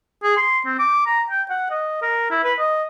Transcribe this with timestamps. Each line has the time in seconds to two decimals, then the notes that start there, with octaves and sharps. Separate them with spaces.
0.23 G#4
0.37 C6
0.66 C4
0.79 D6
1.06 A#5
1.30 G5
1.50 F#5
1.70 D#5
2.02 A#4
2.31 E4
2.44 B4
2.59 D#5